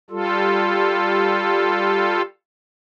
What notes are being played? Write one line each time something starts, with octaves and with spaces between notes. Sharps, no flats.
G3 F4 A4